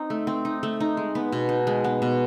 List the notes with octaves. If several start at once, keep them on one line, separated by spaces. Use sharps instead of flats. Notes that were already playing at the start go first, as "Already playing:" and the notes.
Already playing: C4 D#4
A3
C4
D#4
A3
D#4
G#3
B3
B2
D#4
G#3
B3
B2